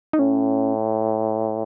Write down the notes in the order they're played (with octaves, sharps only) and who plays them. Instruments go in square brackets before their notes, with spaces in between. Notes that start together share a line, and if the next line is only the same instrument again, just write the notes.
[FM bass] D#4
[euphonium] A2 [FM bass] C#4